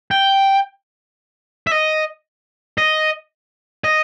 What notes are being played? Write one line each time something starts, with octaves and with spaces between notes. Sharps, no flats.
G5
E5
D#5
D#5
D#5